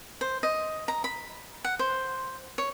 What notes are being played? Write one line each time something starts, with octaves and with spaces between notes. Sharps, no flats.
C5
D#5
A#5
B5
F#5
C5
C#5